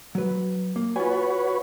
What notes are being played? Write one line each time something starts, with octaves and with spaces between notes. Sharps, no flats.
F#3 B4
A#3
F4 F#4 B4 C#5 G#5